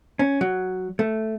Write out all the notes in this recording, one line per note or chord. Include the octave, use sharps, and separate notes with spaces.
C#4
F#3
A3